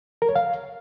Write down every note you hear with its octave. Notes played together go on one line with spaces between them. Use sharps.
A#4
C#5
F5